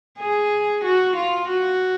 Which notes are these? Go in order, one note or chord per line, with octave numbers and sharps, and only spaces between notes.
G#4
F#4
F4
F#4